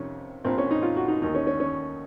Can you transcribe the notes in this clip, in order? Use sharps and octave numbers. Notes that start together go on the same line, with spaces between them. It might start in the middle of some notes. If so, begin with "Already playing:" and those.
Already playing: F2 C3 D#3 C#4
A#1 A#2 C4
C#4
D#4
F4
F#4
D#4
D#2 D#3 D#4
C#4
C#4
C#4